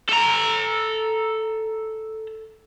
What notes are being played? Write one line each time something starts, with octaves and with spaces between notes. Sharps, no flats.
A4 A#5